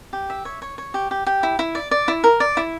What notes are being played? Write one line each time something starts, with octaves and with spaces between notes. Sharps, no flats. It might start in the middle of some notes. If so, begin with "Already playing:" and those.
G4
E5
C#5
C#5
C#5
G4
G4
G4
E4
E4
D5
D5
E4
A#4
D5
E4